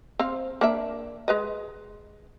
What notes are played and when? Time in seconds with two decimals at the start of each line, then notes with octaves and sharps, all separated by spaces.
0.19 C4 F5
0.61 A#3 D4 E5
1.28 G#3 B4 D#5